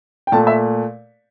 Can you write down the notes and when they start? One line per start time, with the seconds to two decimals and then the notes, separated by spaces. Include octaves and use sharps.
0.27 G5
0.32 A#2 A3 A5
0.47 E5